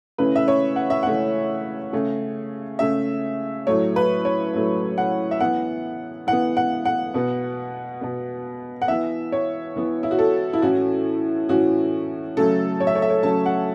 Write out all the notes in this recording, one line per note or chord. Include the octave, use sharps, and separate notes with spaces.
C#3 E3 A3 C#4 B4
E5
C#5
F#5
E5
C#3 E3 A3 C#4 F#5
C#3 A3 C#4
C#3 A3 C#4 E5
A2 F#3 A3 C#5
B4
C#5
A2 F#3 A3
F#5
E5
E3 B3 F#5
E3 F#5
B3
F#5
F#5
B2 B3
B2 B3
F#5
E3 B3 E5
C#5
E3 B3
E4
F#4
A4
E4
A2 E3 C#4 F#4
A2 E3 C#4 F#4
C#3 F#3 A3 C#4 A4
C#5
E5
C#5
E5
C#5
C#3 F#3 A3 C#4 A5
F#5